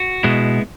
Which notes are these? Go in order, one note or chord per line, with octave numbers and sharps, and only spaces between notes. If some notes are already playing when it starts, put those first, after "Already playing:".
Already playing: F#4
B2 G#3 B3 E4